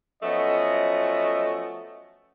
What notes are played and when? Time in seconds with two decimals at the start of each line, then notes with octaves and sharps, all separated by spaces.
0.23 F3 F#3 A3 B3 C#4 D#5